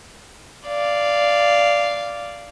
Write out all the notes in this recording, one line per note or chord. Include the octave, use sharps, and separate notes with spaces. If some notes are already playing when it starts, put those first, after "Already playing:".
D5 F5